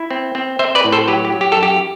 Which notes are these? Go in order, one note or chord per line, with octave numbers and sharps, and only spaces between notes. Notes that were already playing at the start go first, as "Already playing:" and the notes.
Already playing: E4
C4
C4
C4 C5 E5
B4 D5
A2
A4 C5
F#3 G4 B4
G4
F#3
G4
F#2 A4
G4